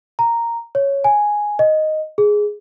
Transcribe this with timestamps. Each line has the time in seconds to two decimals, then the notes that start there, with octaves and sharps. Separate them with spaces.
0.19 A#5
0.75 C#5
1.04 G#5
1.59 D#5
2.18 G#4